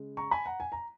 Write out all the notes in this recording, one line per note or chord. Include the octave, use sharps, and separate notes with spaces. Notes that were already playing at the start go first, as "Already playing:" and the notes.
Already playing: C#3 G#3
A#5 C#6
G#5 B5
F#5 A#5
G#5
A#5